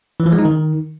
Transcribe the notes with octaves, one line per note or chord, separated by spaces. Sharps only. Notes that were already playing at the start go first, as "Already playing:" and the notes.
E3
F3
G#3
D#4
D#3